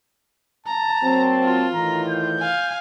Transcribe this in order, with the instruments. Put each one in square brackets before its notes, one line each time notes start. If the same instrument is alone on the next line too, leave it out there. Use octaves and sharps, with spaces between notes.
[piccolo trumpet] A5 [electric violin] A#5
[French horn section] F#3 A#3 C4
[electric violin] F4
[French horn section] A2 D#3 E3 [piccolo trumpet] A#5
[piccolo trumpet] G6
[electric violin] F5 G#5